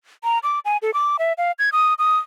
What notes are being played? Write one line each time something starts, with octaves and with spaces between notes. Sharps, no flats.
A#5
D6
G#5
A4
D6
E5
F5
G#6
D#6
D#6